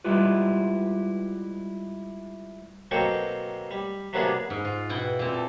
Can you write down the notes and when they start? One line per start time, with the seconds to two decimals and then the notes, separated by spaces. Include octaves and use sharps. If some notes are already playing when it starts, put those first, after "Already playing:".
0.04 G3 G#3 E4 F4 G4 B4
2.91 B2 F#3 A#3 C4 A4 G5
3.71 G3
4.13 C3 F#3 A#3 B3 D4 G#4
4.50 G#2
4.65 F4
4.89 B2 E4 F#5 G5
5.19 A#2 C4
5.34 A4